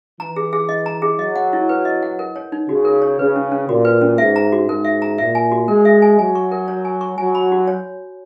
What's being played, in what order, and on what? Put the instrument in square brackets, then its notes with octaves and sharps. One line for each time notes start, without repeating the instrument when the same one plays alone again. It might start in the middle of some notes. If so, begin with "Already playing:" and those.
[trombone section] E3 [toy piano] A#5
[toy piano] G#4
G#4
D#5
A#5
G#4
[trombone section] F#3 [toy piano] D#5
[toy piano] F#5
E4
B4
D#5
F#5
A#4
C#5
D#4
[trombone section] C#3 [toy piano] F#4
[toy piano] A#4
C#5
[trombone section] C#3 [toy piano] B4
[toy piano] C#4
C#4
[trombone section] A#2 [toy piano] F#4
[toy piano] B4
C#4
[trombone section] G#2 [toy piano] E5
[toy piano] A#5
F#4
[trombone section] G#2 [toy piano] A#4
[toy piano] E5
A#5
[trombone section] A#2 [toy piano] E5
[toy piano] G#5
F#4
[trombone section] G#3 [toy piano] A#4
[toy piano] E5
G#5
[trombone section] F#3 [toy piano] G#5
[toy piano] C#6
A#4
C#5
G#5
C#6
[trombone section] F#3 [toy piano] G#5
[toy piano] B5
F#4
C#5